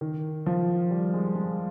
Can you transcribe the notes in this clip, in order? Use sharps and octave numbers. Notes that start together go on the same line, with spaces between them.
D#3
F3
G3
G#3
G#3